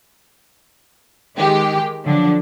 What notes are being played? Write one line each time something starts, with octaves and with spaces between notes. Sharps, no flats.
D#3 G#3 G4
D3 F3 F#3 D4